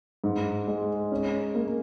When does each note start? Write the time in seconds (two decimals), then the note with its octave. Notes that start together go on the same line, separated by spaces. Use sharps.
0.24 G#2
0.67 G#3
1.12 C#4
1.55 A#3